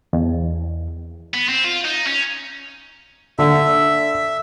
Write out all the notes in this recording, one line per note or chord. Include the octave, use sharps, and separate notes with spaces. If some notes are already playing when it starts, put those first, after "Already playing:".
E2
B3
C4
F4
D#4
C#4
D3 E5